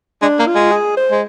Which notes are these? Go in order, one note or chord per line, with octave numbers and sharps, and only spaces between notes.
G#3 D4
A#3
F4
G#3
G#4
C5
G#3